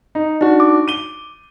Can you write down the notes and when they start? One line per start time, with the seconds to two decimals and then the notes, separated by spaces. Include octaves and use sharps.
0.15 D#4
0.41 D4 D#4 F#4
0.60 D6
0.88 D#7 G7